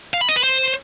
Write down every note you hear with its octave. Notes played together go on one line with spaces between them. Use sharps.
F5
B5
D#5
B4
C5